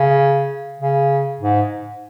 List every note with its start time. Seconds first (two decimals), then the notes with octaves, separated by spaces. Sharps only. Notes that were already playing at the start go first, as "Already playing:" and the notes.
Already playing: C#3
0.80 C#3
1.40 G#2